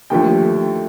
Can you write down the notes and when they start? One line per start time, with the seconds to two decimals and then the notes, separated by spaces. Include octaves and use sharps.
0.10 D#2 D3 F3 A3 G5